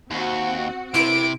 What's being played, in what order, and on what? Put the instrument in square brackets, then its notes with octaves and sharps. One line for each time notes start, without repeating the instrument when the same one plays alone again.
[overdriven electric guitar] D#2 [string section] C4 F#4
[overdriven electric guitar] C3 [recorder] E4 [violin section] D7